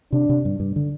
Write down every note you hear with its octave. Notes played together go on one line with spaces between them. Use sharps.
C3 D4
C3
G2
G2
D3